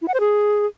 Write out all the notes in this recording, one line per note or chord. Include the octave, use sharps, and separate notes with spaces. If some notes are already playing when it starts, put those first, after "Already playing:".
E4
F#5
C5
G#4